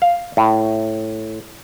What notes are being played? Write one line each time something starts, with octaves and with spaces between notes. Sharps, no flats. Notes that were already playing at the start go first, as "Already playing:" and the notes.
F5
A2